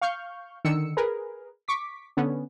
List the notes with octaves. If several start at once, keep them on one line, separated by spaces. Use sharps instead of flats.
F5 C#6 F6 G6
D3 D#3 E6 C#7
G#4 A#4 B4
C#6 D6 B6
D3 B3 C#4